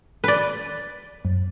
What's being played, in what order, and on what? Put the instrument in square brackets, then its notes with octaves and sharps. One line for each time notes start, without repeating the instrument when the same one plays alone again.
[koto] B4 D5
[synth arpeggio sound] F#2